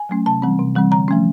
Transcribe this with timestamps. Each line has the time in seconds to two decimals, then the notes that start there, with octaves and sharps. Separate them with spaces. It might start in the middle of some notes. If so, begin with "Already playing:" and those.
Already playing: G#5
0.09 F#3 A3 C#4
0.26 C3 A5
0.42 E3 G3 C4
0.59 C3
0.75 E3 G3 C4
0.91 D3 A#5
1.08 F3 A3 C#4